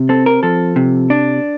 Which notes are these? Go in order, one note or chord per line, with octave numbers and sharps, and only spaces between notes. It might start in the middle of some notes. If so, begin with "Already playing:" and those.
Already playing: C3
C4 A4
A#4
F3 A4
C3
D4